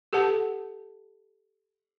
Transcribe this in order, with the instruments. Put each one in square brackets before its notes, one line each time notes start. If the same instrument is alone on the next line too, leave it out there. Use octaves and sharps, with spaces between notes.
[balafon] G4 A4 B4 F#5 A5